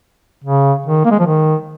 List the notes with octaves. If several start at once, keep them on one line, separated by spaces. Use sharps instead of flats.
C#3
D#3
A#3
G#3
F3
D#3